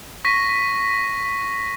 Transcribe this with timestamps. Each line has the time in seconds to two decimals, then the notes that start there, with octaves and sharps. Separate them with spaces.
0.24 C#6 A#6 B6 D#7